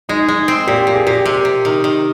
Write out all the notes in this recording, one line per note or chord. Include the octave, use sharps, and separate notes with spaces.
G#3 D#4
G#3 D#4
C4
A#2 G4
A#2
G#4
A#2 G4
C3 G4
C3
D#3
D#3